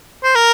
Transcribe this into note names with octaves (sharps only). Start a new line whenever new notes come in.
C5
A#4